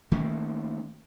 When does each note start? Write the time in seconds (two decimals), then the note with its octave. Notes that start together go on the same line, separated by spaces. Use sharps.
0.12 D#3 A3 A#3 C#4